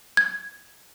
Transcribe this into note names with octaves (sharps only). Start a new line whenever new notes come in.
G#6